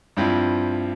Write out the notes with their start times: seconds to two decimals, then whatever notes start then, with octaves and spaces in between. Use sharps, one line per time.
0.17 G2 F3 C4 E4